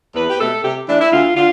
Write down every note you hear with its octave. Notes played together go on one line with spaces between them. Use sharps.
E2 B4
G4
B2 A3 A4
C3 G4
E3 A3 D4
E4
D2 F4
D3 F4